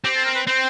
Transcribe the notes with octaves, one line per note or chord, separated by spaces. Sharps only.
C4 G4
A4
A#4
B4
C4 C5